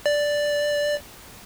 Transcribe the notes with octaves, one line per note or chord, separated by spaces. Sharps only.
D5